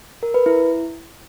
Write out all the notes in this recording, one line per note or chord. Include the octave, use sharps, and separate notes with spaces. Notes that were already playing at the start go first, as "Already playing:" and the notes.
A#4
B4
E4